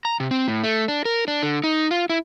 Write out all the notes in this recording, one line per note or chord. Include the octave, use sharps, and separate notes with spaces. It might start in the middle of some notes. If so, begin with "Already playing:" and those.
A#5
C3
C4
A2
A3
D4
A#4
D4
D3
D#4
F4
E4